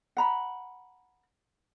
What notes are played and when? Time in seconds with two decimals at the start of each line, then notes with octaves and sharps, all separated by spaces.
0.17 F#5 A#5 B5